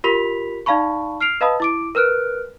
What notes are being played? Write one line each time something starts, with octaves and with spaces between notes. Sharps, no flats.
F4 G4 A#4 B5 B6 F7
D#4 D5 F5 A5 B5 C#6
F6 C7 D7 F7
B4 D#5 F5 A5 B5 D#6
E4 D6 D7
A#4 B4 F6 F#6 D7